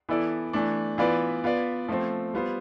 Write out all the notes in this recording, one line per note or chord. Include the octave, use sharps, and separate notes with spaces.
E3 B3 E4 A4 D5
E3 A3 D4
E3 B3 F4 B4 D5
B3 F4 B4 D5
F3 A3 C4
G3 B3 F4 C5